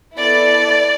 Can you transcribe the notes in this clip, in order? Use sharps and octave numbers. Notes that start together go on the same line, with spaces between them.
B3 E4 A4 D5